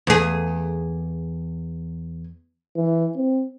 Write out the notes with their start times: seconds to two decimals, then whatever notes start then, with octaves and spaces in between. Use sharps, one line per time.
0.07 E2 G#4
2.76 E3
3.16 C4